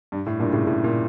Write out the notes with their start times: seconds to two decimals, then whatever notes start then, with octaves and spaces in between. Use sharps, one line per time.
0.12 G2
0.26 A2
0.39 G2 A#2
0.53 A2 C#3
0.67 A2
0.84 A#2